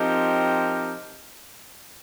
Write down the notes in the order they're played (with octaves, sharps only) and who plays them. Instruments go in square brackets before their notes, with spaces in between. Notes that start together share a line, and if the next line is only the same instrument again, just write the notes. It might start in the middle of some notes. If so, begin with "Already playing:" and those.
Already playing: [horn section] F3 C4 D#4 G4 A#4